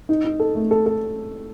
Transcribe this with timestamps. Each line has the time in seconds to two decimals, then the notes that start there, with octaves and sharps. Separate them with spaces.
0.09 D#4
0.24 D#4
0.40 A4
0.55 A3
0.71 A4
0.86 A4